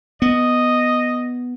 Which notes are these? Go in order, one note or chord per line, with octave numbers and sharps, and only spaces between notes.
B3 D#5